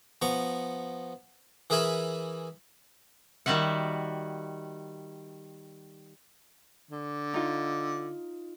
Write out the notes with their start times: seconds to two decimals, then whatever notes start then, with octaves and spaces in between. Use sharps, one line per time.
0.22 F3 B3 A#5 C#6
1.70 E3 G#4 A#4 E5 G#5 B5
3.46 D#3 G3 F#4 E5 F#5
6.91 D3
7.34 D#4 F4